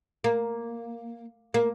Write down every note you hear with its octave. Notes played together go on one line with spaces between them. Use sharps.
A#3
A#3